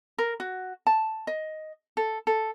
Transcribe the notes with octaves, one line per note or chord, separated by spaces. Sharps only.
A#4
F#4
A5
D#5
A4
A4